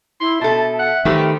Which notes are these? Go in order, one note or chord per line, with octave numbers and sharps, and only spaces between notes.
E4 C6
B2 A4 E5 A5
F#5
D#3 A3 C4 G4 B4